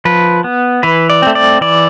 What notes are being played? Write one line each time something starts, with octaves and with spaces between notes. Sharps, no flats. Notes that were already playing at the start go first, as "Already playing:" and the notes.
F3 B4
B3
E3 B4
D5
A3 C4
D5
E3 D5